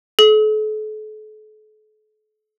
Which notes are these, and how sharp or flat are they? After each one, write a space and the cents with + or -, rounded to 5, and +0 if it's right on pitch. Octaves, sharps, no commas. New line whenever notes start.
A4 -40